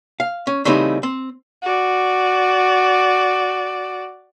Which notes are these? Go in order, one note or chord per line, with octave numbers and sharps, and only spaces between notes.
F5
C#4
C#3 E3 G3 A3 C4 D#4
C4
F#4 D5